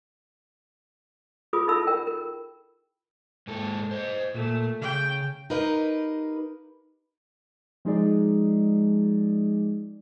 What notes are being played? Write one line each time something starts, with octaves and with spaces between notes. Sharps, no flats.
E4 F4 G#4 B4 D#6
D#4 E4 A4 E5 B5 E6
A#4 G5
A#4
G#2 G#3 A4
C5 D#5
A#2 A3
C#3 G5
D#4 G4 A#4 B4 D#5 F5
F3 G#3 D#4 G#4 D5